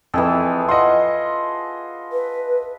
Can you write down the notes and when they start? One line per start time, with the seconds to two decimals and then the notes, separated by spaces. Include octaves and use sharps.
0.14 F2 E3 G#4 A4
0.69 F4 D#5 F#5 C6
2.12 B4